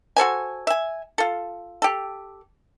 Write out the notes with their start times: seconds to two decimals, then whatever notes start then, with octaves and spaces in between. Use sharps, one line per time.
0.16 F#4 A4 C5 G#5
0.67 E5 G#5
1.18 F4 A4
1.82 G4 A4